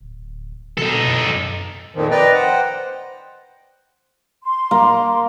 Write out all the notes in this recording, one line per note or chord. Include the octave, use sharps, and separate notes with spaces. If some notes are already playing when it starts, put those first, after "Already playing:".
D1
B2 D#4 A4
F#2
F2 A#2 D#3 F3
B4 D5 D#5 G5 A#5
C5 F#5 G5
C6
A#3